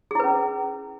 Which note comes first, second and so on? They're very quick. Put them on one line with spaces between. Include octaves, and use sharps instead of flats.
G#4 E4 B4 C#4